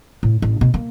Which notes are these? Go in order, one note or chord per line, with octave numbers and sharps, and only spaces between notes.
A2
A1
B2
A#3